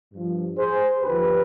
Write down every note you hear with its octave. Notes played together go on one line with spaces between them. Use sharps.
G2 F3
G#4 C5
D#2 D3 F3 G4 B4